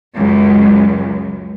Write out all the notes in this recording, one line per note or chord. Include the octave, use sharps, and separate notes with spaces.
C#2 F#2